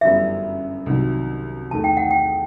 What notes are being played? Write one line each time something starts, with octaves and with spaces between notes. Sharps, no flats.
G1 F#2 E3 G3 B3 E5
C2 C3 D#3 F#3
E2 D#3 A3 A5
G5
F#5
G5